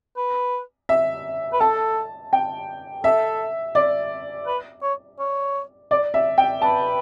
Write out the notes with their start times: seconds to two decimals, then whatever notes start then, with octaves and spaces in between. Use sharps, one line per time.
0.17 B4
0.89 E5
1.53 B4
1.60 A4 A5
2.33 G5
3.04 A4 E5
3.75 D5
4.47 B4
4.82 C#5
5.19 C#5
5.91 D5
6.14 E5
6.38 G5
6.62 B4 A5